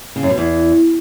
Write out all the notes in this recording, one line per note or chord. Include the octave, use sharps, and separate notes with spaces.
C#3
F#2
B2
E2